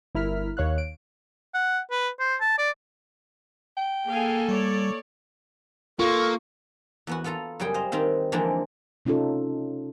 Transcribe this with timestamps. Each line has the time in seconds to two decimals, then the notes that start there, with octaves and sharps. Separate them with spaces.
0.15 G1 E4 A#4 F6 B6
0.57 D#2 C#5 F5 F#6
0.78 D7
1.54 F#5
1.91 B4
2.19 C5
2.41 A5
2.58 D5
3.77 G5
4.08 A#3 G#4 A4 F5 G#5
4.49 G3 C#5 D5
5.99 A#3 F4 A4 C#6
7.07 E2 B3 F#4
7.24 B3 F4 A4 F5 A#5
7.60 F#2 C#3 G3 G#4 G5
7.74 C5 D#5 F5
7.92 D#3 C4 F5
8.32 D3 E3 F3 G#3 A#3 D4
9.06 C3 C#4 D#4 F4 A4